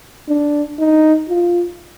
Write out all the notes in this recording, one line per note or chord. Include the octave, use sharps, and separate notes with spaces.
D4
D#4
F4